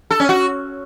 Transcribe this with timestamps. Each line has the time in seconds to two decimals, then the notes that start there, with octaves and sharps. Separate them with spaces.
0.11 A4
0.20 C#4
0.29 F#4